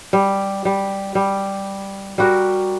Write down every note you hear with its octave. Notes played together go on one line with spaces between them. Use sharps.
G3
G3
G3
G3 F#4 A#4